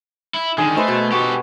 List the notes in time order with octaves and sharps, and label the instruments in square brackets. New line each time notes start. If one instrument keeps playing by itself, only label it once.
[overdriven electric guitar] E4
[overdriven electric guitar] D3 D#3 [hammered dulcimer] G#4
[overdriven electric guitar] A3 [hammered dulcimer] B4 C5 D#5
[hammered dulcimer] B2
[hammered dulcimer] F#4 [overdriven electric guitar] G4 A4